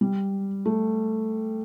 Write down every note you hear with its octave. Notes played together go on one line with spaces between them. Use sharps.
G3
A3